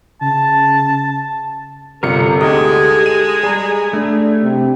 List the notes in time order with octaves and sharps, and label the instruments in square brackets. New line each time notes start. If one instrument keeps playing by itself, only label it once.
[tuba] C#3 [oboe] A5
[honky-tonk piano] G1 C3 C#7 [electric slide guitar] F4 A#4 [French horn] A4
[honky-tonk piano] D2 D#4 D#6 [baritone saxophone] G#3 [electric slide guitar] G4
[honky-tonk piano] D#7
[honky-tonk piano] G3 [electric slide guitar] G#4 A#5
[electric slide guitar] A3 [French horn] D4
[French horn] C3